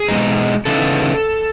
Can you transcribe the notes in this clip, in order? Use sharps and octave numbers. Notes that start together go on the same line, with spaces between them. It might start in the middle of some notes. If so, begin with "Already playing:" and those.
Already playing: G#4
B2 G#3 D#4
C#3 E3 B3 D#4 A4